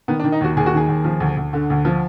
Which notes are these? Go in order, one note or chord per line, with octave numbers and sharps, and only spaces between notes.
D#3 B3
D4
D#3
D#4
D#2 F#4
D#2 G#4
F#4
D#3 G#4
D#2
F3
D2
D2
D3
D2
F3